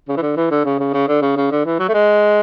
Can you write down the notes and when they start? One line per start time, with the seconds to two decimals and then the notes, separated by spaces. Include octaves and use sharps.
0.08 C#3
0.17 E3
0.22 D3
0.37 E3
0.51 D3
0.65 C#3
0.80 C#3
0.94 C#3
1.08 D3
1.22 C#3
1.36 C#3
1.51 D3
1.66 E3
1.79 F#3
1.89 A3
1.94 G#3